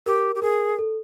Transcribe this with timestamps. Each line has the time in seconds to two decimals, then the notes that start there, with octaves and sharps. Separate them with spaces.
0.06 G4 A#4
0.35 G4
0.42 G#4 A#4
0.79 A4